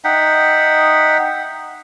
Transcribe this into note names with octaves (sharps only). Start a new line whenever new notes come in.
D#4 E5 F#5 G5